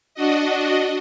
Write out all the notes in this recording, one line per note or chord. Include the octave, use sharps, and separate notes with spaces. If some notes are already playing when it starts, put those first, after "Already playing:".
D4 F#4 D#5